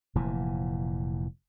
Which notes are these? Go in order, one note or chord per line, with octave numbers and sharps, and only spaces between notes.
F1 A#2 E3